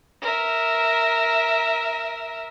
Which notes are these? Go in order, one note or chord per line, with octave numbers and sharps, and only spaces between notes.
A#4 E5